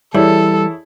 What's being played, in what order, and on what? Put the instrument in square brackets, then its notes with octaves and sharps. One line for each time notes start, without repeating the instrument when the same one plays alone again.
[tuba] E3 [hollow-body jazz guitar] G3 [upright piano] E4 G#4 C#5 [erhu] A4